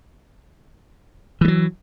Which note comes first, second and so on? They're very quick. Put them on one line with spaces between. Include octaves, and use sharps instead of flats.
E3 G#3 F#3